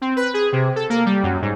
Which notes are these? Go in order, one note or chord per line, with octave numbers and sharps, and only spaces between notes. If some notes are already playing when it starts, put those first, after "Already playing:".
C4
B4
G#4
C3
A4
A#3
G3
F#2
G#2